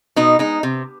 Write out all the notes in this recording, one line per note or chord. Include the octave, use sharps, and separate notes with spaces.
B2 D#4
G#3 D#4
C3